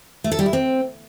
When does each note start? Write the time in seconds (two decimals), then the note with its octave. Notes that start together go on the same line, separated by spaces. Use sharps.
0.24 A3
0.32 A4
0.39 G3
0.46 E4
0.53 C4